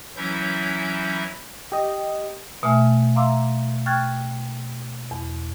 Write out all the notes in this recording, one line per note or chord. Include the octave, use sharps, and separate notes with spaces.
E3 F#3 C#4 E4 E5 G6
G4 D#5
B2 A3 E5 G#5 F6
E5 F5 A#5 C6 D6 E6
G5 C#6 F6 F#6 G#6 A6
E2